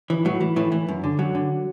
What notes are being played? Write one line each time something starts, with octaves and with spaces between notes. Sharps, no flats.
E3
A2 F#3
E3
A2 E3
E3
F#2
D3
F#2 F#3
D3